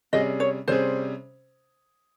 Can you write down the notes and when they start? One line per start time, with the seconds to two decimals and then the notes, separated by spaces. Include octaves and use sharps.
0.13 C3 G3 C#4 G#4 D#5
0.40 C#5
0.68 C3 G3 C#4 G#4 C5